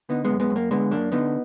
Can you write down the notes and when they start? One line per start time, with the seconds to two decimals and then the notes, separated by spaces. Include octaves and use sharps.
0.09 D3 B3 D#4
0.25 G#3 B3
0.30 F#2
0.40 G#3 B3
0.50 F#2
0.56 A#3
0.71 D3 G#3 B3
0.91 F#2 A#3 D4
1.12 D3 B3 D#4